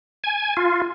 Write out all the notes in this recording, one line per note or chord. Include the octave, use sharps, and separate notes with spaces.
G#5
F4